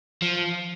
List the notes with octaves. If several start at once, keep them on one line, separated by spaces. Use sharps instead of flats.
F3